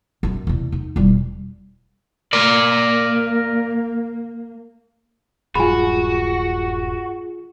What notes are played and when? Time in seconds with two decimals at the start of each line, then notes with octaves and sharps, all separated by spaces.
0.23 F#2 D4
0.47 E2 C3
0.72 D#4
0.96 E1 G3
2.33 A#3 A#4 D5
5.55 D#1 G2 F#3 F4 F#4 G#4 G#5 B5